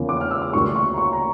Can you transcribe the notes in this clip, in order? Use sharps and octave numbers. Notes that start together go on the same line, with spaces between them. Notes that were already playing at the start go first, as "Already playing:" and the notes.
Already playing: E2 C#3 F3 A#3
D6
F6
E6
D6
D2 C#3 G3 A#3 C#6
C#6
A#5
C#6
A#5